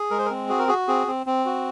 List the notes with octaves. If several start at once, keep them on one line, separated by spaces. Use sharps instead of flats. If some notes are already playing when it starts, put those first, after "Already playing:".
Already playing: G#4
G#3 A#4
C5
A#4
C4
F#4 G#4
A#4
F#4 G#4
C4 G#4
C4
C4
F#4